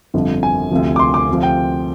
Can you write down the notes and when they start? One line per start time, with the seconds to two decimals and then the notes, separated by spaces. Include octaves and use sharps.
0.14 G1 F2 D3 F3
0.43 G#5
0.71 D2 C3 F3
0.96 D6
0.99 C6
1.14 D6
1.29 D2 C3 F3
1.43 G5